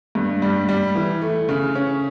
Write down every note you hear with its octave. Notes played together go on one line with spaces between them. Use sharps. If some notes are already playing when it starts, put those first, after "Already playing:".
G2
G3
G3
E3
A3
C#3
C#4